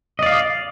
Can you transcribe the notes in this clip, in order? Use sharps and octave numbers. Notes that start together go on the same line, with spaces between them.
D5 D#5 F5